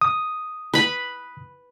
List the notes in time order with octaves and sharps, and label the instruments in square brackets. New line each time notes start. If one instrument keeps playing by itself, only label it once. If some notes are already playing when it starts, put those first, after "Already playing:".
[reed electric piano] D#6
[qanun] B4 B5